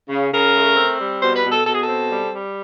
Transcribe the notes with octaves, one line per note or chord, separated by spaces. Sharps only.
C#3
C#3 A#4
A3
C4
G3
B2 C5
B4
B2
A4
B2 A4
G#4
A4
C4
G3
G3